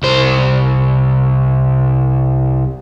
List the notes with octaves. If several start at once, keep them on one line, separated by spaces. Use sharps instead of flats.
C2 C5